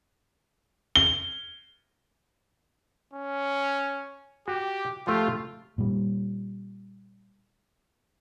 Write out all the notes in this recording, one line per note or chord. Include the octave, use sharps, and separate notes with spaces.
G7
C#4
F#4 G4
F3 A3 F4 G4
A#2 G3